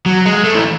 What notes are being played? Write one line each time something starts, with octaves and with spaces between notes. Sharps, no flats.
F#3
G#3
A3
E3